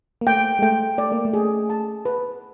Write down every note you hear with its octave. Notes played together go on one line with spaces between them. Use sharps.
A#3
A3 G5
G#3
A3 G5
A3 D5
A#3
A3
G#4
A5
B4